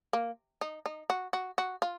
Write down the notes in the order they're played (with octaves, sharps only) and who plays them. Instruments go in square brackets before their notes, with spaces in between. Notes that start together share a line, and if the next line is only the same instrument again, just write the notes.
[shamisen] A#3
D#4
D#4
F#4
F#4
F#4
F4